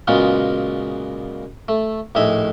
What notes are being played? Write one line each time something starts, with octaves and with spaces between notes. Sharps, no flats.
A#2 C#3 F#3 G#3 B3 F4
A3
A#1 A2 D#4 E5 G#5